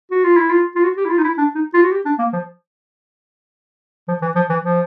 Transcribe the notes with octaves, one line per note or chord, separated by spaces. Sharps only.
F#4
F4
E4
F4
F4
F#4
G4
E4
F4
D#4
E4
D4
D#4
F4
F#4
G4
D4
A#3
F3
F3
E3
F3
E3
F3